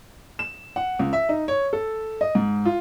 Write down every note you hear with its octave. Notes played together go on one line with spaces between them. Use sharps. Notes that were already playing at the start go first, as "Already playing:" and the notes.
E7
F#5
C#2
E5
D#4
C#5
A4
D#5
G#2
F4